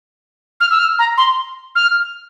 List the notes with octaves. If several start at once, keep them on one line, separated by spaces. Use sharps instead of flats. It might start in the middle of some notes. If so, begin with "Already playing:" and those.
F6
E6
F6
A#5
C6
F6